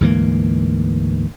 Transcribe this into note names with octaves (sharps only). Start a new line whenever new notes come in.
D2 G#2 E3 A#3